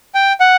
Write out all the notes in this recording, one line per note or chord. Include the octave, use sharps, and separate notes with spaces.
G5
F#5